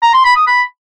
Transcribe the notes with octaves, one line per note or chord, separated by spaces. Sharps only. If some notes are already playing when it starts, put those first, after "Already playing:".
A#5
C6
B5
D#6
B5